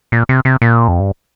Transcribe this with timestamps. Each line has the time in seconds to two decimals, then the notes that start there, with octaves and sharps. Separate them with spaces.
0.12 A#2
0.29 C3
0.45 C3
0.62 A#2
0.88 F2
1.00 G2